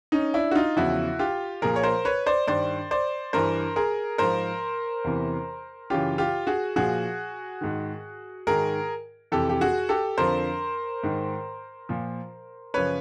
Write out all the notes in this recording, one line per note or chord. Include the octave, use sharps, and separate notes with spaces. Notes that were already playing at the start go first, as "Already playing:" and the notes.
C#4 D#4
D4 E4
F#4
D#4 F4
E2 C#3 F3 E4 F#4
F4 G4
A#2 F3 G#4 A#4
C#5
A#4 C5
B4 C#5
C5 D5
G2 D#3 C5 D5
C5 D5
G2 E3 A#4 C5
G#4 A#4
G#2 F3 A#4 C5
E2 C3 E3
F#2 C#3 E3 F4 G4
F4 G4
F#4 G#4
A#2 F3 F#4 G#4
G#2 D#3
G#2 D#3 G#4 A#4
F2 C3 E3 G4 A4
G4
F#4 G#4
G4 A4
F2 D3 F3 A#4 C5
G#2 D#3
A#2 F3
F#2 C#3 F3 B4 C#5